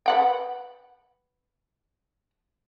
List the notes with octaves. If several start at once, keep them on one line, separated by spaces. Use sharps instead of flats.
B4 F#5 G5